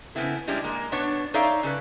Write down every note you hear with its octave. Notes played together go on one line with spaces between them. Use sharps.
C#3 B3 C4 E4 A4
F3 G3 G#3 D4 E4
G#3 A#3
B2 B3 D4 C#5
D#4 A4 C#5 D5 E5 F5
C#3 A4 B4